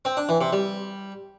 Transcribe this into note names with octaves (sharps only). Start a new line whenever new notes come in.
C4
D4
E3
C3
G3